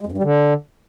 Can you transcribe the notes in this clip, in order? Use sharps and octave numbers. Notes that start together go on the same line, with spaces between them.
G#3
F2
G2
G3
D3